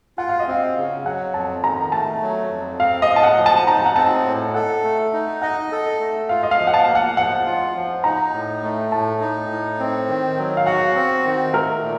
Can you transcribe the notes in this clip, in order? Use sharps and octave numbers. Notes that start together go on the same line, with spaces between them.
F4 F#5
F5
D#5
C4 F5
C#3
F#3 F#5
F2 A5
D#3 A#5
A3 A5
F#3
F2
C4 F5
D#5
A2
A5
F#5
F3
A5
D#4 A#5
A5
F#5
C4 A5
A2
A4 F#5
A3
D#4
D#5 F#5
A4
A3
F4 F5
D#5
F5
F3
F#5
A5
A#3
F#5
F3 F#5
F4
F3
D#4 A#5
A2
A3
A2 A5
D#4
A2
C4
D#3
F#3
F5
F#4 F#5
C4
D#3
A3 A#4
A#2